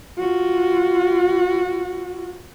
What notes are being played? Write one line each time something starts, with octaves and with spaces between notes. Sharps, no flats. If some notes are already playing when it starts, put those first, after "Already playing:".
F4 F#4